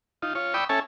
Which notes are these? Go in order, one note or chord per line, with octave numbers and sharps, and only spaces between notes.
D#4 F4
F4 C#5
D5 G5 B5 C#6 D#6 E6
C#4 A4 C#5 E5 G#5 A5